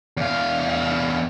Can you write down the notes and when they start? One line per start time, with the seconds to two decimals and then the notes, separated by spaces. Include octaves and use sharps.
0.17 E2 F5